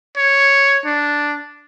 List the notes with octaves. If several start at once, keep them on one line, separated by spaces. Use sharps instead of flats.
C#5
D4